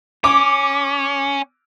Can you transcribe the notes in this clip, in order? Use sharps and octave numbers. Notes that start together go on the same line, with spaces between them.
C#4 D6